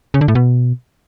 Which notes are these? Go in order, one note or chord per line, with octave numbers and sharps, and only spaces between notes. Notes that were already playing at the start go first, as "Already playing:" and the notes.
C#3
D3
A2
B2